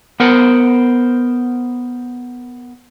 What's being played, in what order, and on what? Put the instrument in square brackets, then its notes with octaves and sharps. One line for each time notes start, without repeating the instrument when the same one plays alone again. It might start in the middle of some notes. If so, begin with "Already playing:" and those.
[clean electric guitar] B3 A#4 C5 F#5